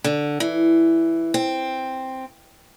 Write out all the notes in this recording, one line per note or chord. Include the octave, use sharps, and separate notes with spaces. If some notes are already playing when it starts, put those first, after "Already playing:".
D3
E3
C4